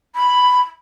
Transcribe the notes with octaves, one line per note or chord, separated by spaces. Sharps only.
B5